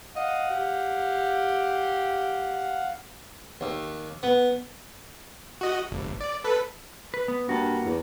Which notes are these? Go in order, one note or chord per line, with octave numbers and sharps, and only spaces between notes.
D#5 F5 F#5
G4
D#2
B3
F#4 D#5
G1
D5
A4 B4
B4
B3
G2 A#3 F#4
E2